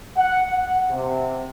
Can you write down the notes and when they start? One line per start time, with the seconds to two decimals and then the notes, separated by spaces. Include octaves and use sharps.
0.16 F#5
0.50 F#5
0.91 C3